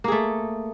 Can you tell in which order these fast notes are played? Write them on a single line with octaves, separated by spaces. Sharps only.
A#3 G#4 A3